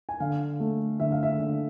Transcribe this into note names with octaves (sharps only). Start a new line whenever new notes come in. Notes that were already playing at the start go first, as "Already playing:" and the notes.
G#5
D3 F5
A3
D3 E5
F5
E5
D3